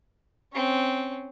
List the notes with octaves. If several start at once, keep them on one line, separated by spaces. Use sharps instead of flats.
C4 C#4